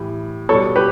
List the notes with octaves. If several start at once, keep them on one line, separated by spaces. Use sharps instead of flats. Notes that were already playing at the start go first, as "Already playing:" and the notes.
Already playing: A2 E3 G3
B2 G3 A4 C#5
G4 B4